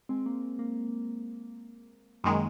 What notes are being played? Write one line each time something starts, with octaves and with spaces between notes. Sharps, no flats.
G#3 C4
A#3
A#3
F#2 D#3 G#3 A#3